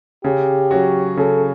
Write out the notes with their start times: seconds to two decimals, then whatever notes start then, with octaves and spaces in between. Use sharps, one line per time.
0.24 C#3 G4
0.71 F#3 C#4 F#4
1.17 C#3 A4